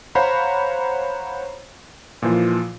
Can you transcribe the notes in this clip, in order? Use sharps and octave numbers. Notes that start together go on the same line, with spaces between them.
C5 C#5 F5 F#5 A#5 B5
A#2 E3 F3 F4